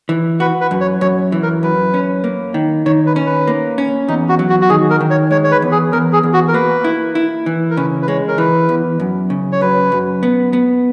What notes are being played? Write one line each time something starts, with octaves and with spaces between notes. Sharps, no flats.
E3
F#4 B4
B4
F#2
C#5
F#2 C#5
E3
A#4
F#2 B4
C#4
A#3
D#3
D#3 C#5
B4
C#4
B4
A#3
C#4
E2 D#4
F#4
F#3
F#4
F#4
D#3 G#4
A#4
D#3
C#5
G#3 C#5
C#5
B4
E2
G#4
E2 A#4
G#4
E2
F#4
A#4
A#3 B4
E4
E4
E3
A#4
C#3 B4
B4
G#3 C#5
A#4
E3 B4
E2
F#2
C#3
C#5
F#2 B4
F#2
B3
B3